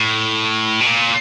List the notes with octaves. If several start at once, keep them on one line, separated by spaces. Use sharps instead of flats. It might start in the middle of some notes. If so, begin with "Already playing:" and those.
Already playing: A2
B2
A#2